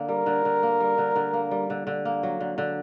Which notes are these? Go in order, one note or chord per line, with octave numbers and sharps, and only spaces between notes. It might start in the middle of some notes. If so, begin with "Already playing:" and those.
Already playing: D3 A#3
G3 A#4
D3
D3
A#3
G3
D3
D3
A#3
G3
D3
D3
A#3
F#3
D3
D3